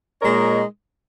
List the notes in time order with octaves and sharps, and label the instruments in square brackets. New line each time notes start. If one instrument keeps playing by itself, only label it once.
[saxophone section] A#2 G#3 D#4 A#4 C#5